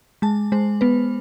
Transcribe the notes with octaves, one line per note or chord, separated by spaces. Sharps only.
G#3 A5
G#3 C5
B3 B4